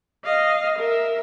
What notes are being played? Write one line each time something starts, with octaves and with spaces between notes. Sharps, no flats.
D#5 F5
A#4 E5